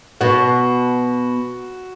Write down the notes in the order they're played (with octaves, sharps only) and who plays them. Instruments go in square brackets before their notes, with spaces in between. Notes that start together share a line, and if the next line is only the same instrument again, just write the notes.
[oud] B2 [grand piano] F#4